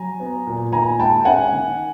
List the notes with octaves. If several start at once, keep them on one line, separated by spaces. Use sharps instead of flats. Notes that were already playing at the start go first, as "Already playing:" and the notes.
Already playing: F#3 G#5 A#5
B3
A#2
D#3 G#5 A#5
G#3 G5 A5
C#4 F#5 G#5
D#3